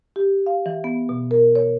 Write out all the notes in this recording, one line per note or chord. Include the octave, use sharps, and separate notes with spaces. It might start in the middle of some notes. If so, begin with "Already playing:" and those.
G4
F5
E3
B3
B2
A#4
C#5